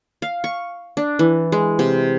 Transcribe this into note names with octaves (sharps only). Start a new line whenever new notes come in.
F5
C#6
D4
E3
G#3
C3